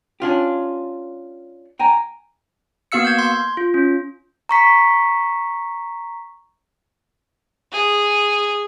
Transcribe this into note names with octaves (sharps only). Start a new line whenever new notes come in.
C#4 D4 F4 G4
G5 G#5 A#5
A#3 B3 F#4 F5 E6 C#7
G6 G#6
C6
F4
C#4
A#5 C#6 B6
G#4